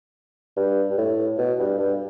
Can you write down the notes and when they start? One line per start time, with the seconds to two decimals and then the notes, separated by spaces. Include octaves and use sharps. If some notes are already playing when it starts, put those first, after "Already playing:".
0.57 G2
0.90 G2
0.98 A2
1.38 B2
1.59 G2
1.79 G2